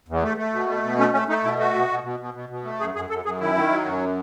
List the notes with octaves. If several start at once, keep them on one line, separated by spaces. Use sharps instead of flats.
E2
A3
A3
B2
A3
B2
A3 C#4
A3 C#4
A3 D#4
B2 E4
A3 F#4
B2
B2
B2
B2
B2
B2
A3
F#2 G#4
F#2 G#4
F#2 A4
F#2 G#4
D#3 E4
D#3
F#3
F#2